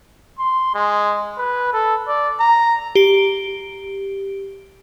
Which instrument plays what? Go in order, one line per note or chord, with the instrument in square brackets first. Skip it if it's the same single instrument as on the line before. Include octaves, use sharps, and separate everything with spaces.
[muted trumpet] C6
G#3
B4
A4
D5
A#5
[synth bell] G4 D7